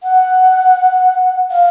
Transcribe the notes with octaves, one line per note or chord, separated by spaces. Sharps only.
F#5
F5